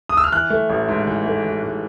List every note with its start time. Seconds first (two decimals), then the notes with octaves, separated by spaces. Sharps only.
0.09 D#6
0.17 E6
0.24 F6
0.32 E3 F#6
0.50 A3
0.70 A1
0.89 G#2
1.07 E3
1.26 A3
1.45 A1
1.62 G#2